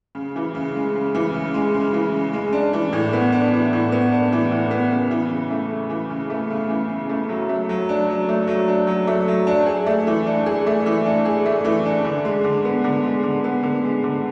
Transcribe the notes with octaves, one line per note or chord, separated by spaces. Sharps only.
C#3
E3
C#3
G#3
C#3
E3
C#3
G#3
C#3
E3
C#3
G#3
D4
E3
A2
B3
D4
E3
A2
B3
D4
E3
A2
B3
C#3
E3
C#3
A3
C#3
E3
C#3
A3
C#3
E3
C#3
A3
F#3
A3
F#3
D4
F#3
A3
F#3
D4
F#3
A3
F#3
D4
G#4
A3
E3
D4
G#4
A3
E3
D4
G#4
A3
E3
D4
D3
G#3
D3
B3
D3
G#3
D3
B3
D3
G#3
D3